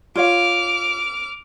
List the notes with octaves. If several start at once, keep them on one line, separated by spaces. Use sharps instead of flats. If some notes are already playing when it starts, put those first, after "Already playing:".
F4 C#5 F5 D6 F6